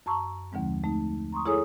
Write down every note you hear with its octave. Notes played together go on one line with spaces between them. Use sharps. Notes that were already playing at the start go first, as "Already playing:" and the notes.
F#2 A5 A#5 C#6 E6
D#2 D3 F3 G#3 C4
A3 D#4
A#5 C6 C#6 D#6
E4 G#4 A4 C#5 G#5 D#6